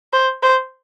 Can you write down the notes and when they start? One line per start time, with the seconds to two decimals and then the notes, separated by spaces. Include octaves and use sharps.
0.13 C5
0.43 C5